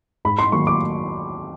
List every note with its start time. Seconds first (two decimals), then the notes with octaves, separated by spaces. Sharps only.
0.25 G#2 B5
0.39 C6
0.52 D#3 F#3 A#3 C#6
0.67 D6